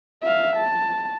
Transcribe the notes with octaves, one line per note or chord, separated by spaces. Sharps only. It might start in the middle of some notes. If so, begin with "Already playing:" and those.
E5 F5
A5